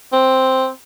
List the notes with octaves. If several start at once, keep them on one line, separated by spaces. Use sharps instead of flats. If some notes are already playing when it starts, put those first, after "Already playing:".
C4